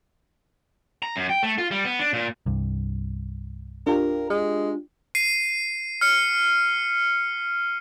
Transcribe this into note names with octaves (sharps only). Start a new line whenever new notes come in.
A#5
F#2
G5
A3
F4
G3
B3
D4
A#2
C2 G2
D4 F4 G4 A#4
G#3
C7 D#7
F6 C#7